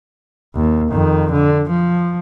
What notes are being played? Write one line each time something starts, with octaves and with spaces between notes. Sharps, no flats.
D#2
F2 D#3
D3
F3